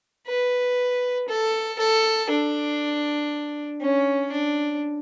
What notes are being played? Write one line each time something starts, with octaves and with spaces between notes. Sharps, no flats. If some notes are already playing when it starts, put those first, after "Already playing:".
B4
A4
A4
D4
C#4
D4